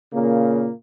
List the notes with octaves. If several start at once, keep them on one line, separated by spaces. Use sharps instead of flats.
A#2 C#3 A#3